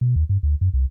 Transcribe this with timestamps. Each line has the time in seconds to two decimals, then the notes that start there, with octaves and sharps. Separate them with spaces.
0.01 B2
0.16 D#2
0.29 G2
0.43 D2
0.61 F#2
0.73 C2